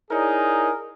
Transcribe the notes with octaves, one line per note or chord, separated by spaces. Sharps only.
D#4 E4 G#4 A#4 C#5 D5